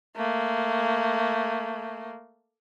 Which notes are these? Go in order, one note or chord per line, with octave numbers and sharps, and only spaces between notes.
A3 A#3